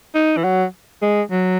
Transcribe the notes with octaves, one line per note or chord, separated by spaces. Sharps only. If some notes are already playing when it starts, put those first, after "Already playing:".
D#4
E3
F#3
G#3
F#3